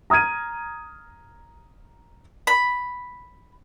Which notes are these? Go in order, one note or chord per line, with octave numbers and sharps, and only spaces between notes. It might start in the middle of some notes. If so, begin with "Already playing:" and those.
A#5 D#6 F6 G#6 D#7
B5